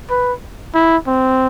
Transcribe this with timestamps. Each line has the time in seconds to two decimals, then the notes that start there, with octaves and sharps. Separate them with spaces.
0.10 B4
0.74 E4
1.07 C4